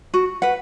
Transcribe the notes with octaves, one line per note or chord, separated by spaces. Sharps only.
F#4
B4 F#5